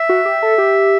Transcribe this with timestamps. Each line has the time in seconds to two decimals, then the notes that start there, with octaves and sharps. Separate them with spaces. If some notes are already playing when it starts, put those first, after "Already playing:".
Already playing: E5
0.09 F#4
0.26 G4
0.43 A4
0.58 G4